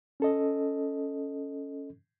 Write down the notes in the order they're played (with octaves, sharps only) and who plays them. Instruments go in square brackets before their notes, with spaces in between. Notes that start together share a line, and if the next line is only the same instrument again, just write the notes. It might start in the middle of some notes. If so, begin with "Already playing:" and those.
[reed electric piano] C#4 A4 D#5